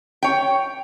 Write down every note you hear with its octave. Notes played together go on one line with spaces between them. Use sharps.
C#5 G5